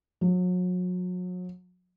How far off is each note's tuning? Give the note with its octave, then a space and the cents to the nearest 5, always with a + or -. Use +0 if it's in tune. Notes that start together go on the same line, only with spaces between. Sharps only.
F#3 -35